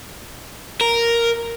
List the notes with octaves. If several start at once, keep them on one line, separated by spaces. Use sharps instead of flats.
A#4